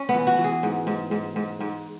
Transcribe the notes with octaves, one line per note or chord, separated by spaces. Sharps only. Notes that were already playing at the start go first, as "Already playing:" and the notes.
Already playing: C#4
E3 B3
F#4
E3
G#4
G#2
G#2
G#2
G#2
G#2